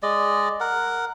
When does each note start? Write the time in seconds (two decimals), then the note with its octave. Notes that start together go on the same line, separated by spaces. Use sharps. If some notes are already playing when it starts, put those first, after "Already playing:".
0.03 G#3 D5 D#5
0.60 A#4 F#5